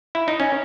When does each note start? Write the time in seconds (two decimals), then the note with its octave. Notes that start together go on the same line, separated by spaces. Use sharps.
0.15 E4
0.28 D#4
0.40 C#4